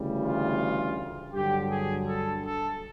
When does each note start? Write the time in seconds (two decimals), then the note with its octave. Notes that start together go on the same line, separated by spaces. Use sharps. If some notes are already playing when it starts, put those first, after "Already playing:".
Already playing: D2 C#3 E3 G3
0.23 F4
1.34 G2 D3 F#3 G4
1.71 G#4
2.08 A4
2.45 A4